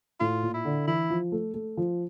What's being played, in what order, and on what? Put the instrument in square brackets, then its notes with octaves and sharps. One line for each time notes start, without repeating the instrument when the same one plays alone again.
[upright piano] A2 [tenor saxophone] F4
[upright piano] A#2
[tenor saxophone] E4
[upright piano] D3
[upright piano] E3 [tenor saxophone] E4
[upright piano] F3
A3
A3
F3